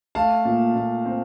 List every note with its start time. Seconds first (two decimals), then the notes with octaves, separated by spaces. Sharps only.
0.15 A3 F5 A5
0.45 A#2
0.75 A#2
1.05 C4